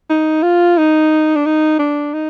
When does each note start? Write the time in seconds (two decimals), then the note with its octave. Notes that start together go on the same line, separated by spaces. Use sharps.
0.10 D#4
0.43 F4
0.78 D#4
1.36 D4
1.46 D#4
1.79 D4
2.14 D#4